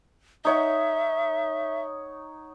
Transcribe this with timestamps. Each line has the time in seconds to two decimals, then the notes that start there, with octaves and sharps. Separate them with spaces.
0.45 D#4 C#5 E5 F#5